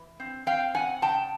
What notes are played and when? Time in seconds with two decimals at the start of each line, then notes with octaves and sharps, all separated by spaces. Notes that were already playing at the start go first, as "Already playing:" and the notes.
Already playing: E3
0.20 C4
0.46 C4 F5 G5
0.74 C#3 F#5 G#5
1.02 C#3 G5 A5